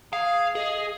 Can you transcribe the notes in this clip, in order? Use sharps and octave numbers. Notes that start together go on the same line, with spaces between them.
G#4 F5
G#4 D#5